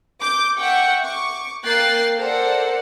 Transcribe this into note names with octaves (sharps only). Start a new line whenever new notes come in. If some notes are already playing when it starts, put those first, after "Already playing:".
D6 G6
E5 F#5 G5 C#6
C#6 D6
A#3 G5 F#6 A6 C7
A4 A#4 C5 D5 F#5